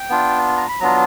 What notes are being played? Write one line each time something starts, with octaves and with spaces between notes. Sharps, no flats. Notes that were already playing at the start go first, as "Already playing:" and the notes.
Already playing: G5
B3 D4 F4
A#5
B5
F#3 B3 D4 F4 A#5